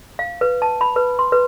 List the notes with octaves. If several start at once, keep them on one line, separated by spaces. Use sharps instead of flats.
F5
B4
A5
B5
B4
C6
B4